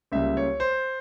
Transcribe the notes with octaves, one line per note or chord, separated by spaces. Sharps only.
C#2 C#3 G3 A#3 E5
C#5
C5